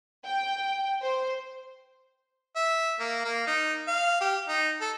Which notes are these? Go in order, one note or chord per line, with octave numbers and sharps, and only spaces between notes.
G5
C5
E5
A#3
A#3
D#4
F5
G4
D#4
A4